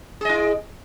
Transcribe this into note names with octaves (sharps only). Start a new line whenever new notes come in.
E4 G#4 D#5